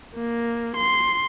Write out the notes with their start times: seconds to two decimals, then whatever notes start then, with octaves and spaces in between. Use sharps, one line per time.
0.16 A#3
0.76 C6